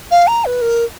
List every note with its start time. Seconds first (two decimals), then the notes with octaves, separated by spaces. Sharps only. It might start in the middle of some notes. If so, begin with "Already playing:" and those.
0.11 F5
0.27 A#5
0.45 B4
0.62 A#4